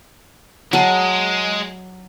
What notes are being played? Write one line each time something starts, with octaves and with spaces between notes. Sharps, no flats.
F#3 G#3 A5